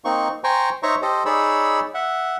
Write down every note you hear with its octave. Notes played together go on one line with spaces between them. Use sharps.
A#3 C4 D#4 C#6
C5 G5 G#5 A#5 C#6
D#4 C5 C#5 E5 A#5 C#6
G4 A4 C5 D#5
D#4 G#4 C#5 D5 B5 E6
E5 F#5